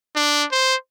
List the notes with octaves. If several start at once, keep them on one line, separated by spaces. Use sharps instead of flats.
D4
C5